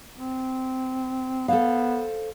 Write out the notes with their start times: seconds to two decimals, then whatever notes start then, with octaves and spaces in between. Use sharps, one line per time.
0.17 C4
1.48 B3 A4 C5 F5